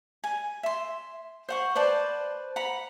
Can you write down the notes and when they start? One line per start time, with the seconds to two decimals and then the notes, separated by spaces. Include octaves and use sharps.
0.24 G#5
0.63 E5 C6
1.49 C5 F#5 C#6
1.75 B4 C5 D5 A5
2.56 F#5 A#5 B5